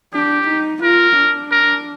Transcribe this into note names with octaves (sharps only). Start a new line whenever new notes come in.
D4 G4
D#4
F4 A#4
D4
A#4